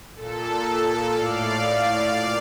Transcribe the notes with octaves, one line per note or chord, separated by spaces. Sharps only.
A#2 A4
A2 D5 F5
A#2